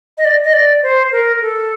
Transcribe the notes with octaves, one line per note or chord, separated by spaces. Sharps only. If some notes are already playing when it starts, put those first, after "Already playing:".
D#5
D5
D#5
D5
C5
A#4
A4